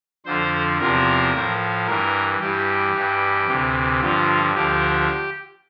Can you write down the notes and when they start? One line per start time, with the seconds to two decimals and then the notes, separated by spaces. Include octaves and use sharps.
0.25 F2 D3 F3 C5
0.79 E2 C3 F3 A#4
1.33 A2 F3
1.87 G2 E3 A#4
2.40 G2 E3 G4
2.93 G2 E3
3.48 D2 C3 E3
4.01 G2 D3 F3 F4
4.54 D2 D3 F3 G4